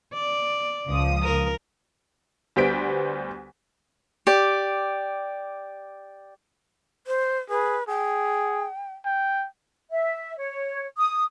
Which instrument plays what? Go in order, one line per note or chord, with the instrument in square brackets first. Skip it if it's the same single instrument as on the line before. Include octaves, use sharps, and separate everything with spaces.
[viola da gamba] D5
[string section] C#2 F3 D#6
[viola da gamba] A#4
[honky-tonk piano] D2 G3 B3 C5 B6 D7
[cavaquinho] G4 D5
[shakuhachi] C5
[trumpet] G#4 [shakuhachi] B4
[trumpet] G#4 [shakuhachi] G5
[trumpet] G5
[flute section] E5
C#5
D#6